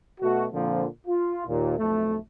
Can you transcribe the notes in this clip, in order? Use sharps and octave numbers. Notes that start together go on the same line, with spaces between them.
B2 A3 F#4
A#2 D3 F3 A#3 C4
F4
D#2 A#2
B1 F2 A3